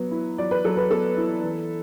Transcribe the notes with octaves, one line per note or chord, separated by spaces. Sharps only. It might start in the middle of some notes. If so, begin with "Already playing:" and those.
Already playing: F#3 B3
E4
F#3 D5
B4
F#3 A4
B4
B3 A4
E4
E3